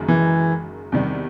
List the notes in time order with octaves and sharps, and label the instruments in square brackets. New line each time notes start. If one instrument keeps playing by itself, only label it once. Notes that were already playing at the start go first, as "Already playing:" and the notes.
Already playing: [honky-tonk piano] F#1 F#2 D#3 G#3
[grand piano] E3
[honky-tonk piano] E2 C3 D#3 G3